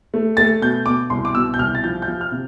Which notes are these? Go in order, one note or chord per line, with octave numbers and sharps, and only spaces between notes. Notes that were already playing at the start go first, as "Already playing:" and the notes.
A3
A3 A6
B2 G6
B2 D6
C2 C6
D6
B2 E6
G6
C2 F6
A6
F3 G6
G6
F3
F6
C3